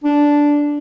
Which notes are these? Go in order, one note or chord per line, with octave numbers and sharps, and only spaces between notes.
D4